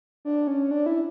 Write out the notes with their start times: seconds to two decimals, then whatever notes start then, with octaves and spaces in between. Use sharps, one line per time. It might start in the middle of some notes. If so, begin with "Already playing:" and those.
0.25 D4
0.47 C#4
0.71 D4
0.86 E4